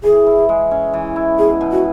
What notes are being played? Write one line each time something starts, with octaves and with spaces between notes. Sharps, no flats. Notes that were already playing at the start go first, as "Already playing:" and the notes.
E3 G#4
E4
G#3
C#4
E3
E4
B2 G#4
B2
F#4